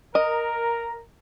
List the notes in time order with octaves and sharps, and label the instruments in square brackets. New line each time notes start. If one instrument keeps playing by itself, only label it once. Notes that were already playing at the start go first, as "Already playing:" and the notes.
[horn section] A#4 A#5 [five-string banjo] D#5